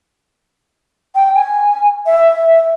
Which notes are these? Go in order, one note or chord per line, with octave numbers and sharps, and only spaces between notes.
G5
G#5
E5